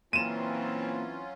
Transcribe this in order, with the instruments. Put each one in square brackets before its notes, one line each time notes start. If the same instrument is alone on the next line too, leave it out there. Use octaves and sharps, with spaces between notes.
[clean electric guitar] A#2 [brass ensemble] E3 C4 [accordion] F#3 C#4 F4 [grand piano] D#7 E7